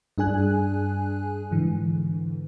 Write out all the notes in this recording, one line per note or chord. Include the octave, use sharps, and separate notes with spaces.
G2 D4 G#4 G#5 F#6
G#2 D3 E3